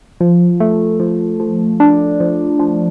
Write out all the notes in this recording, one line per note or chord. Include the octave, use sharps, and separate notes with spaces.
F3
A3
F3
F3
D4
F3
F3